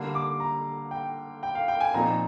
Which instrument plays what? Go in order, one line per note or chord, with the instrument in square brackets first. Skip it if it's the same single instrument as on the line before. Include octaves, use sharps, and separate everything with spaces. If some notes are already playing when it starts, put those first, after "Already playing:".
Already playing: [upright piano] D3 G3 A#3
D6
A#5
G5
G5
F5
G5
G#5
A#2 F3 C4 D#4 A#5